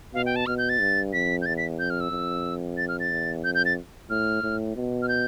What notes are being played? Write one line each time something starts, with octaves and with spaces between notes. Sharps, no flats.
B2 F5
G5
A5
B2 F6
G6
A6
G2
F2 B6
G6
E2 A6
B6
F2 G6
F6
E6
F2
A6
F6
A6
E2
F2 G6
G6
A6
A2 F6
A2
B2
F6
G6